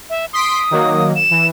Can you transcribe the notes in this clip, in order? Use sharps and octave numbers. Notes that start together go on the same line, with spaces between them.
E5
C6 D#6 B6 D7
D#3 F#3 A#3
E7
E3